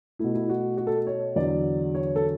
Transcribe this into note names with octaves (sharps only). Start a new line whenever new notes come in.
B2 A3 E4
E4
F#4
F#4
A4
C#5
E2 D3 F#3 D5
C#5
A4